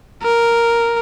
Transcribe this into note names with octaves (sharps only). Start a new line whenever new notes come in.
A#4